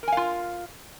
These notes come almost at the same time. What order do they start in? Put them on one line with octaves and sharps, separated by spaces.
A#4 G#5 F5 F4